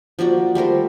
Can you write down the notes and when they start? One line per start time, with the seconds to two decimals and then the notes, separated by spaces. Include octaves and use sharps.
0.19 F3 A#3 F#4 D5
0.55 G3 A3 A#4 C5